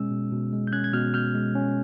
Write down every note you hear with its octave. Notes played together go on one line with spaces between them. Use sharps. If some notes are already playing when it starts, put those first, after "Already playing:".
Already playing: B2 G#3 C#4 E6
B2
B2
G#3
G6
C#4 F#6 G#6
G#6
B2 F6 G6
B2 F6 G6
G#3
C#4